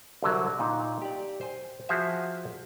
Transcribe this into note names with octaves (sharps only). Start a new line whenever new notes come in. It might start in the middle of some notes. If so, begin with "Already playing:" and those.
C2 D3 F#3
A#2 D#4
G4 D5
C5 G#5
F3 F#4 G#4 C5 E5